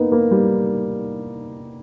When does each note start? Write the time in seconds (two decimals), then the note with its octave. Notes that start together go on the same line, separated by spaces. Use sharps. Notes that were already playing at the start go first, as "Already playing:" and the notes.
Already playing: A#3 B3 D#4
0.12 A#3
0.31 G3